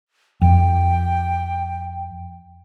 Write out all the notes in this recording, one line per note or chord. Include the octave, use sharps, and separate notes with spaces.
F2 G5